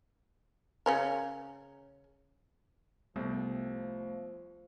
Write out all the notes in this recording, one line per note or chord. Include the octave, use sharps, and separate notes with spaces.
C#3 C#4 A#4
C2 F3 A3 B3